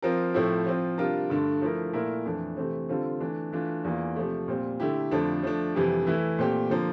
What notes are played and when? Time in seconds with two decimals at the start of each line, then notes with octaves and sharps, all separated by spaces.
0.02 F3 C4 F4 A#4
0.34 A2 F3 A3 C4 E4
0.66 F3 C4 F4
0.98 C3 G3 D4 F4 A#4
1.30 G2 D3 A3 D4
1.62 F3 A3 E4 A#4
1.93 A#2 A3 E4 A#4
2.25 F2 E3 A3 D4
2.57 C3 E3 A3 C4
2.89 D3 G3 C4 F4 A4
3.20 E3 A3 D4
3.52 E3 A3 D4 F4
3.84 E2 E3 A#3 F4
4.16 C3 F3 A3
4.48 A#2 G3 C4
4.80 D3 A3 E4 G4
5.11 F2 D3 F3 A3 D4
5.43 F3 A3 D4
5.75 F2 C3 E3 G3
6.07 E3 A3 E4
6.39 A#2 A3 C4 G4
6.70 D3 F3 A#3